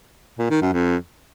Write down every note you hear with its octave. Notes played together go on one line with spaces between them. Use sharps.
A#2
D#3
F#2
F2